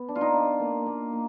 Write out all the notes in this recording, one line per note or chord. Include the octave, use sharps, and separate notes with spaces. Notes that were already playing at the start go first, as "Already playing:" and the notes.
Already playing: B3
D4
F4
D#4
D4
A#3
A#3
A#3